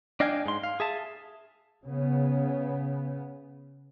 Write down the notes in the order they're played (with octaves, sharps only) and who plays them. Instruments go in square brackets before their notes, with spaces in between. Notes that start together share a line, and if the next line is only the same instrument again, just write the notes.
[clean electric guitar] D4 D#5 F5 G5 G#5
G#2 C6
F5
G#4 E5 A5
[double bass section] C#3 B3